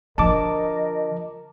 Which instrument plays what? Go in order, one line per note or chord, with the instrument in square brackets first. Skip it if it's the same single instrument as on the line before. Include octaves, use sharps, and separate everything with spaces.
[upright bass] D3 F3 [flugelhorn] A#4 [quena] D#5 [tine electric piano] A5 D6